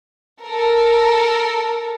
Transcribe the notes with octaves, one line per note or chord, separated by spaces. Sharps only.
A4 A#4